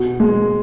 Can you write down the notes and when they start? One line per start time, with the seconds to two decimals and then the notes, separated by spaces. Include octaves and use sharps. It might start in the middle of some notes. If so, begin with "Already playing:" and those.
Already playing: B2
0.20 G#3